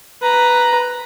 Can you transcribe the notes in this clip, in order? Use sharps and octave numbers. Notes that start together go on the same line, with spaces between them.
B4 A#5